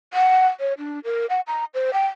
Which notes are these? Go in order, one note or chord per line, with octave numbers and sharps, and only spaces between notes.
F#5
C#5
D4
A#4
F#5
A#5
C5
G5